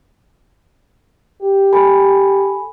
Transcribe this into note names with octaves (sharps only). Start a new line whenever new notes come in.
G4
A4 G#5 B5